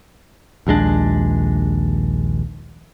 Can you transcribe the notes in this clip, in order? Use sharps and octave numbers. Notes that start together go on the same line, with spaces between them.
A#1 D#2 G#3 D4